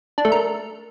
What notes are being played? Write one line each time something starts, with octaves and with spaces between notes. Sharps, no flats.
D4
A3
A#4